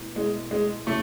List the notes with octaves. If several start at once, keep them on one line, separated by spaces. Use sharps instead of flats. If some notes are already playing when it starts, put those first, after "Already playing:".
Already playing: B2 A3 E4
B2 G#3 A3 E4
G#3
C#3 F#3 A3 C#4 E4